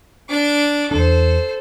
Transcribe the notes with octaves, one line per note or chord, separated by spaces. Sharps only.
D4 D6
E2 D4 A4 C5